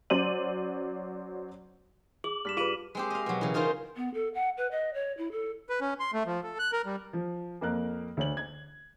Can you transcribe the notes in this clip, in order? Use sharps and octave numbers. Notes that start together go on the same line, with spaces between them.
F#3 C#4 C5 D5 D#7 F#7
G#4 D6 F#7
G2 F6 B6 E7
F4 G#4 B4 B6 D#7 F#7
G#3 C4 G4
D#5 F5
B2 F#3
C#3 E3
C#4 D#4 F4 A#4 C5
B3
A4
F#5
B4
D#5
C#5
E4
A4
B4
C#4
C6
A3
F3
A4
F#6
A#4
G3
F3
F2 A#3 A#4 F#6
D2 C#5 F#7
G#6